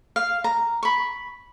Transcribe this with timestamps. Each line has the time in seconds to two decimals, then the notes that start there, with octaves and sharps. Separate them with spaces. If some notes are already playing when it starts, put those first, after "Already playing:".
0.16 F5
0.44 A#5
0.83 B5 C#6